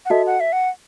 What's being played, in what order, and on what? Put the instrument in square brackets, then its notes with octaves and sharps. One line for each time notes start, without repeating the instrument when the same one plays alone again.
[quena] F#5
[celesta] F#4 A4 D#5 A5 [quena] E5
[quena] F#5
E5
F#5